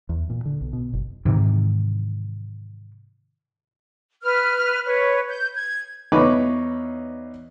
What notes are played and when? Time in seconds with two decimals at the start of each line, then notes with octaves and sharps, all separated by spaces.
0.09 E2
0.30 A#2
0.46 D3
0.61 B1
0.73 B2
0.93 F#1
1.25 G#2 C3 D#3 E3
4.23 B4 F6
4.86 B4 C#5
5.28 G6
5.54 G#6
6.12 E2 D#4 B4 C#5 B5 D6